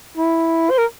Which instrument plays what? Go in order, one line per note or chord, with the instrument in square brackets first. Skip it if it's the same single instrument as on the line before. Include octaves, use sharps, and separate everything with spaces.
[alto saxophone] E4
C5
A#4